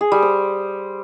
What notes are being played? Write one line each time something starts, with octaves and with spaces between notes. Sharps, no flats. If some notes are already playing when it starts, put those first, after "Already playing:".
G#4
G3
C5